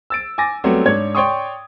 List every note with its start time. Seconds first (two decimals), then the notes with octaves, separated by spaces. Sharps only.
0.10 E6 A6 D7
0.38 G#5 D6 A6 A#6
0.64 F#3 G3 A3 B3 C4 F#4
0.85 G#2 D4 C#5 G#6
1.15 C#5 D5 G5 C6 C#6 D#6